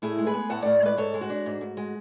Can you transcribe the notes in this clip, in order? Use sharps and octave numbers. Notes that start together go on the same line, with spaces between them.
A2 E4 G#4
G#3
G#4 B4
B3
A2 F#5 A5
A2 D5 F#5
G#3 B4 D5
G#2 A4 C#5
G#3
F#4
D4
G#2
G#2
G#3